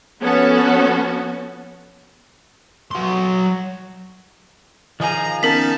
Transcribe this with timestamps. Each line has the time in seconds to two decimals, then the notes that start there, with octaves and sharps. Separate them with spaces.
0.21 F3 B3 C#4 F#4 A4
2.91 F#3 C6
5.00 D#3 F3 G#4 G#5 A#5
5.43 B3 C#4 D#4 A#4 A5 B6